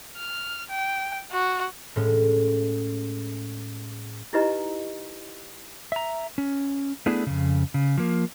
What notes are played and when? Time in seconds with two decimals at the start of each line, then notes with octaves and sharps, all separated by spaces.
0.17 F6
0.70 G5
1.32 F#4
1.96 A2 G#3 C#4
4.33 D#4 E4 G4 B4 D#5 A#5
5.92 E5 A#5
6.38 C#4
7.06 A3 B3 D4 E4 G#4
7.27 F2 C#3
7.74 C#3
7.98 F3 A#3